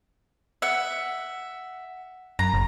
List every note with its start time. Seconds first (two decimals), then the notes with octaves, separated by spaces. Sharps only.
0.62 E5 F#5
2.39 F#2 A#5
2.54 F#1